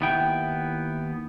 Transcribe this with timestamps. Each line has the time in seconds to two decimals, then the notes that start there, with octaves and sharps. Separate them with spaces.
0.01 D#2 B3 E4 G5